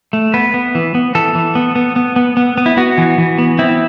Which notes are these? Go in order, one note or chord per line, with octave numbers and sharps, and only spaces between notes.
A3
B3 B4
B3
E3
B3
E3 A4
E3
B3
B3
B3
B3
B3
B3
E4
B3 F#4
E3
E3
B3
C4 E4